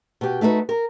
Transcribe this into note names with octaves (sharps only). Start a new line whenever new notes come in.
B2 G4
A3 D#4 F#4 G#4 B4
A#4